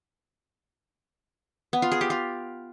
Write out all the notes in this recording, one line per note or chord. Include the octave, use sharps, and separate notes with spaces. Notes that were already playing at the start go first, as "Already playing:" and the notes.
B3
F4
G#4
G4
F4